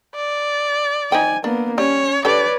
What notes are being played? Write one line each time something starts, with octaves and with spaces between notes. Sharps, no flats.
D5
D#4 C5 G5 G#5
A#3 B3 D4
G3 C#4 C#5
D4 G4 A4 B4 C#5 D5